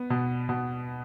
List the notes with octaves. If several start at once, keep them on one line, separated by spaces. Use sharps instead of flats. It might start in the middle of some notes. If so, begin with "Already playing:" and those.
Already playing: B3
B2
B2